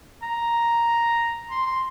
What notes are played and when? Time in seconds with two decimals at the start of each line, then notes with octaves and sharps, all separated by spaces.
0.23 A#5
1.51 C6
1.66 C6